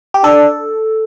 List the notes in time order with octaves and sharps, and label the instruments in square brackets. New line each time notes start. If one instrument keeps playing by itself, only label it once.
[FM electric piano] G4
[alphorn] D4 [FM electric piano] A4